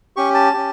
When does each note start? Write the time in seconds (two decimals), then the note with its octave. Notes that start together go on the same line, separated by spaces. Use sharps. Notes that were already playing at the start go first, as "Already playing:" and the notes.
0.16 C#4 G4 C#6
0.34 A5
0.53 C#4 G4